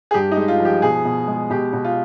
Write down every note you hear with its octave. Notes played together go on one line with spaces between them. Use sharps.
G#4
G2 G4
D#4
G#3
F4
F3 G4
B2 G#4
B2
G#3
B2 G4
B2
F4